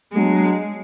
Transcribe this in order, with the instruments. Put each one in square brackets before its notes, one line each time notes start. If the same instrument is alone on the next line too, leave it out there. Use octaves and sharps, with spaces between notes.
[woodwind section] F#3 B3 D4 F#4 [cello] G#3